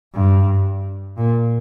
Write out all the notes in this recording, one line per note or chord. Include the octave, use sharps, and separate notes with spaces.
G2
A#2